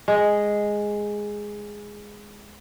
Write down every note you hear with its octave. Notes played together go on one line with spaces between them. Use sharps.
G#3 G#4